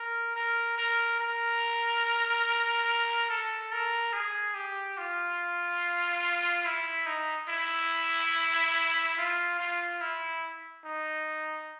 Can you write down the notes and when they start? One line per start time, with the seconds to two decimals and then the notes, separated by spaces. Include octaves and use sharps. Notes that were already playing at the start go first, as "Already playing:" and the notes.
Already playing: A#4
0.36 A#4
0.78 A#4
1.20 A#4
3.30 A4
3.72 A#4
4.13 G#4
4.55 G4
4.98 F4
6.65 E4
7.07 D#4
7.49 E4
9.18 F4
9.59 F4
10.01 E4
10.85 D#4